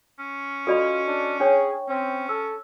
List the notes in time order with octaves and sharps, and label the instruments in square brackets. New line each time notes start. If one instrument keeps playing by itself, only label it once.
[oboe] C#4
[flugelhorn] F4 [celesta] F#4 D#5 [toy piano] A4 D5 B5
[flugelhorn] D4
[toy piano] D4 C#5 [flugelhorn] G#4 [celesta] G5 C#6
[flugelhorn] C4 [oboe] C#4
[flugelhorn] A4 [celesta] E6